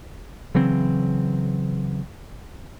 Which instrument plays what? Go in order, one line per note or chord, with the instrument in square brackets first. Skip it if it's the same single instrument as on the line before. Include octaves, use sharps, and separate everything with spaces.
[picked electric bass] C#3 E3 F#3 C4